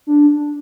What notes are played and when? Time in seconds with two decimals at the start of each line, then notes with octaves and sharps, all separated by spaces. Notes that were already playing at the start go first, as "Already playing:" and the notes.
0.07 D4